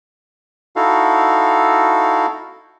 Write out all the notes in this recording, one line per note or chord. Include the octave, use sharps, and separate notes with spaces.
D#4 E4 F#4 A4 F5